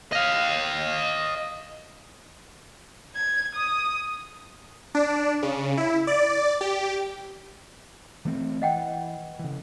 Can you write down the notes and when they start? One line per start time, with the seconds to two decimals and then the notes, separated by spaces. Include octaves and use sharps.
0.12 D#5 F5
3.15 G#6
3.55 D#6
4.95 D4
5.43 C#3
5.77 E4
6.07 D5
6.61 G4
8.25 E3 A3 C4
8.62 E3 D#5 F#5 G5
9.39 C#3 E3